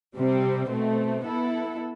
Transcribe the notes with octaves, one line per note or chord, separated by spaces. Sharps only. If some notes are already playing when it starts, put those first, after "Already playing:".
C3 G3 C4
B2 A3 C4
B3 E4 A4